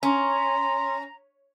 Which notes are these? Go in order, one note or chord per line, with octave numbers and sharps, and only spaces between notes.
C#4 A#5 C6